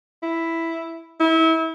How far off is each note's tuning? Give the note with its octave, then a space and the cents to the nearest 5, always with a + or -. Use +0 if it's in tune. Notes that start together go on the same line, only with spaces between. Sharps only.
E4 +0
E4 -30